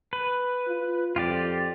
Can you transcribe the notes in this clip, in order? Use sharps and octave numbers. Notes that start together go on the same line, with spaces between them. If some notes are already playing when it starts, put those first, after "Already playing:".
B4
F4
F2 F4 G4 D5